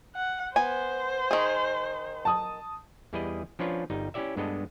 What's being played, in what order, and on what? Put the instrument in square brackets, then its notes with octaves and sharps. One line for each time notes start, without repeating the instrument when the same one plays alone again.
[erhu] F#5
[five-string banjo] B3 G#5 [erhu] C5
[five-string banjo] D#3 G#4
[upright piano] A5 D#6
[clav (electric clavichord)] E2 G3 E4 G#4 B4 D#5
F3 C#4 D4 F4 B4 C#5
G1 G3 D#4
C#4 E4 G4 D5 E5
G2 G#3 B3 D4 A4 D#5